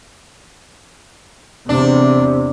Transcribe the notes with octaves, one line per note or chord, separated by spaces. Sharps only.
E2 C3 D4